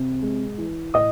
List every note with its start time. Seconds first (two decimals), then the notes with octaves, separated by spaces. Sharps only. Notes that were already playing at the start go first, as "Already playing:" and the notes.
Already playing: C3
0.22 G#3
0.58 E3
0.94 A2 D#5 D#6